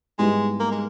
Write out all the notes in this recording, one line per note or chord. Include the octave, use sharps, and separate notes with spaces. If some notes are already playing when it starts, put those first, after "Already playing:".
G#2 G3 G#3 B3 E4 G4
A#3
G#3